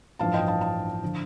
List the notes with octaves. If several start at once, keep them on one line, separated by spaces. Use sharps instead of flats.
A1 G2 F3 F5 A5
D#5 G5
F5 A5
F5 A5
D3 F3